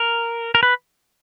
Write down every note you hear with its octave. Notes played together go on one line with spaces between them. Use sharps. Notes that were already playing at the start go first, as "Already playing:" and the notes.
Already playing: A#4
A#4
B4